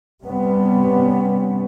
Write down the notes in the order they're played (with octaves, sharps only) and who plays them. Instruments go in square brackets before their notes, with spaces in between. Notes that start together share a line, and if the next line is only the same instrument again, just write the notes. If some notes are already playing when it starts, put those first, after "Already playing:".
[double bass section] C3 G3 B3 C#4